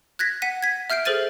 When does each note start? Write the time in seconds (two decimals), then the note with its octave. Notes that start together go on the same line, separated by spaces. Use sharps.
0.19 F#6 G#6 A#6 B6
0.42 F#5 B6 D#7
0.63 G#6 B6
0.90 E5 F6 G6 C7 D7
1.05 G#4 A4 C5 F6 A6 D#7